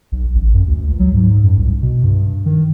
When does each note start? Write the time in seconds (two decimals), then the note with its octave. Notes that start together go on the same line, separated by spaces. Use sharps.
0.12 B1
0.35 A1
0.54 F#2
0.67 D2
0.87 C#2
0.99 F#3
1.14 G#2
1.43 F#2
1.58 C2
1.82 B2
2.03 G2
2.46 D#3